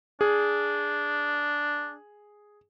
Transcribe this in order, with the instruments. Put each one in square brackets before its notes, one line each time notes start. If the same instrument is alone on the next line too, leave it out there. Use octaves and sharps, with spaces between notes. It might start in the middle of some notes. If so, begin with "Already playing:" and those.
[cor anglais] D4 [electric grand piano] G#4